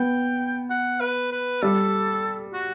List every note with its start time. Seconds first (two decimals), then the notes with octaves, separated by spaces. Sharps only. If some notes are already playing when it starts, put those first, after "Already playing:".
Already playing: B3 G5
0.70 F#5
1.01 B4
1.32 B4
1.62 G3 A4
2.54 F#4